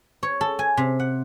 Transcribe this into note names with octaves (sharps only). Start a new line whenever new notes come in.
C#5
A4
G#5
C3
F#5